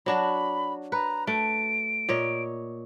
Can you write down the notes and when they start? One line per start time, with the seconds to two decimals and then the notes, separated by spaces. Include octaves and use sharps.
0.06 F#3 D4 F#4 B5
0.92 B4 A#5
1.27 A3 D7
2.09 A#2 C#5 D#5